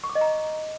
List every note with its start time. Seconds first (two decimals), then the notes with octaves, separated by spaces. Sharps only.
0.04 C#6
0.09 D6
0.15 D#5
0.21 A#5